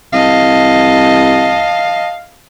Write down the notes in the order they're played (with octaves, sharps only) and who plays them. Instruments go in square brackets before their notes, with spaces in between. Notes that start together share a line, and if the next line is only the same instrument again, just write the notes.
[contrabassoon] C2 [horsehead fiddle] D#5 A5 [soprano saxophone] F5